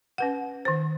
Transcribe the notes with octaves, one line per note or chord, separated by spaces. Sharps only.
C#4 B4 F#5
D#3 C5